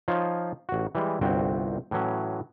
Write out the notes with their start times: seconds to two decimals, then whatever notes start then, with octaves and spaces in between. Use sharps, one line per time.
0.08 F3 D#4 F4 C#5
0.69 A1 F#4
0.95 E3 G3 G#3
1.21 G1 C2 C4 F#4 G5
1.91 A2 E3 F#3 C#4